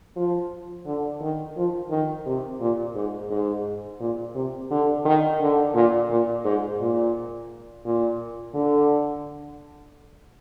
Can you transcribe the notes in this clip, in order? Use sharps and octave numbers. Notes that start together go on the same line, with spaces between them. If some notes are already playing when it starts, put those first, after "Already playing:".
F3
D3
D#3
F3
D#3
C3
A#2
G#2
G#2
A#2
C3
D3
D#3
D3
A#2
A#2
G#2
A#2
A#2
D3